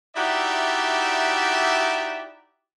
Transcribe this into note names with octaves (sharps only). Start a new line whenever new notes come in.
D#4 E4 F#4 G4 D5 E5